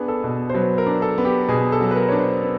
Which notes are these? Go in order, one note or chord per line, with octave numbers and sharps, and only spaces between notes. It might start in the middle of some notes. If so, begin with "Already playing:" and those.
Already playing: B3 D4 G#4
A4
B2
C5
F#3 B4
A#4
D4
A4
B3
G4
B2 G#4
A4
F#3
B4
A#4
D4 C#5
C5
B3